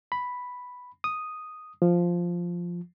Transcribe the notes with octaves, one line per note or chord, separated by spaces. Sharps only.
B5
D#6
F3